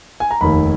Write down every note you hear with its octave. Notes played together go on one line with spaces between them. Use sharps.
G#5
A#5
F1 D#2 D#3 B5